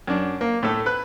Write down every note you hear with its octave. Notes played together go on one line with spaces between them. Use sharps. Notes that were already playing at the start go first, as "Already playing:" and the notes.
F#2 D4
A#3
A2 A3 A4
B4 F#6